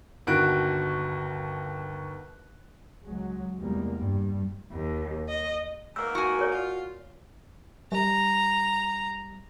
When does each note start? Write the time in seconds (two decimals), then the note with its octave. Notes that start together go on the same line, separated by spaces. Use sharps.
0.27 G1 D#2 F#4 F#6 D7
3.05 C#2 F#3 G#3
3.59 E2 C3 G3 G#3 A#3
3.96 G2 G3
4.73 D#2
5.30 D#5
5.96 G#2 B2 A#3 E6
6.15 F#4 G#5
6.39 A#4 C#5 D5
6.52 F4
7.92 G3 A#5